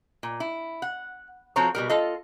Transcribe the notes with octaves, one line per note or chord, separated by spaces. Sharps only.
A#2
E4
F#5
F3 C4 F#4 A4 C#5 A#5
B2 G3 A#4
F4 A4 D#5